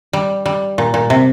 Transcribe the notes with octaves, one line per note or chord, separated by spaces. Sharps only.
G3
G3
A#2
A#2
C3